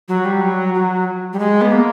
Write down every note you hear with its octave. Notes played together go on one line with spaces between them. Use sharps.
F#3
G3
F#3
F#3
G3
G#3
B3
A#3